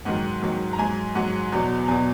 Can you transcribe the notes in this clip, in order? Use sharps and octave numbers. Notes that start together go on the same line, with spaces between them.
G#2 D#3 F#3 F#5
G#2 D#3 F#3
A#5
G#2 F#3 G#5
G#2 F#3 F#5
E2 B2 F#3
E2 B2 F#3 G#5